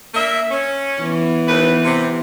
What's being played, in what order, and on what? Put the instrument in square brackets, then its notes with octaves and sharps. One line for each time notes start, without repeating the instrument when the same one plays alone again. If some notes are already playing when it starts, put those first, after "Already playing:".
[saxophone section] A#3 D4 E5
C#4
[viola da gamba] E3 B3
[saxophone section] D#2 B4
C3